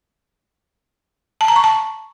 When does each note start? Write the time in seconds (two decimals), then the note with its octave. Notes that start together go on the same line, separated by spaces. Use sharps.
1.41 A5
1.48 A#5
1.56 C#6
1.64 A5